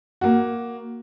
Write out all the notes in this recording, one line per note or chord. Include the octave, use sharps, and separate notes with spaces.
A#3 F#4